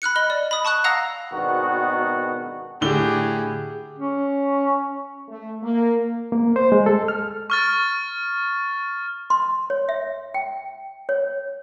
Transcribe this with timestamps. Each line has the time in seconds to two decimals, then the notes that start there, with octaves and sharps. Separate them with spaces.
0.02 B5 F6 F#6 C#7
0.16 D#5 B5 G7
0.30 D5
0.51 B5 D#6
0.65 A5 C#6 D#6 F#6
0.84 F5 F#5 A#5 D#6 E6 A#6
1.33 G#1 B2 D#3 B3 D4 F#4
2.81 A2 D3 G4 G#4 G7
3.99 C#4
5.28 A3
5.62 A#3
6.32 A#3
6.56 C5
6.72 G#3
6.86 A4
7.08 F6
7.50 C#6 F6 A6
9.30 C6
9.70 C#5
9.89 E5
10.34 G5
11.09 C#5